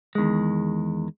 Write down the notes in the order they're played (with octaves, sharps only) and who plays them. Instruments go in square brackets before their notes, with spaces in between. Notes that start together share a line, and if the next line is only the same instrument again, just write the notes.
[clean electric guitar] E2 D#3 G#3